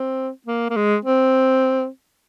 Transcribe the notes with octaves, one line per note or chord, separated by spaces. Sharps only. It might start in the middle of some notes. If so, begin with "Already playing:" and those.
Already playing: C4
A#3
A#3
G#3
C4